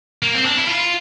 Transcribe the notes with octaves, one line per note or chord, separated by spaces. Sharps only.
A#3
C4
D4
E4
F4